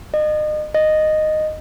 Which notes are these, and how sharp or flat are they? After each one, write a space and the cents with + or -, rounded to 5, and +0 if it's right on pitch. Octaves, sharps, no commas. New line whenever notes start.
D#5 -35
D#5 -10